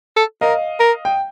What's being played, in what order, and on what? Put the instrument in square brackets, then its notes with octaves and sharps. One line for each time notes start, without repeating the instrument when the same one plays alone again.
[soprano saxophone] A4
[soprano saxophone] A#4 [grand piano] D#5 F5
[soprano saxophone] A#4
[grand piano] G5